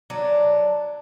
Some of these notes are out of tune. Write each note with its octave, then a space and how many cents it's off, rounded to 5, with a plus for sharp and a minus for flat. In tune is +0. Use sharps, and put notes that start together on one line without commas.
F#3 +0 D4 +0